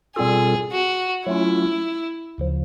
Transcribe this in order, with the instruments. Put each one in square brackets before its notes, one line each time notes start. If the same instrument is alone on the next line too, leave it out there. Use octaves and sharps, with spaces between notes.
[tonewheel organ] B2 G3 C4 F4 A4 [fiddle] G#4
[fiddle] F#4
[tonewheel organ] F#3 A3 C#4 F4 [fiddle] E4
[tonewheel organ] D2 C#3 F3